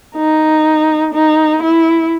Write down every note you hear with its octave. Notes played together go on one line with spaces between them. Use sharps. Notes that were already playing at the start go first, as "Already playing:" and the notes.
D#4
D#4
E4